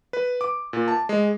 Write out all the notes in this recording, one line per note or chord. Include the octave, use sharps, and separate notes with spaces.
B4
D6
A#2
A5
G#3